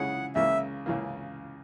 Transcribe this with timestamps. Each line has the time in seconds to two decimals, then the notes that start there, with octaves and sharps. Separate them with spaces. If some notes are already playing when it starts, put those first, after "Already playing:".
Already playing: C#3 G#3 C#4 E4 G#4 F#5
0.35 C#2 C#3 E3 A#3 E5
0.86 C#2 C#3 E3 A#3